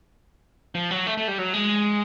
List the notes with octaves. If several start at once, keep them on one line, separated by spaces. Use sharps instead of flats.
F3
F#3
A3
A3
G3
F#3
G#3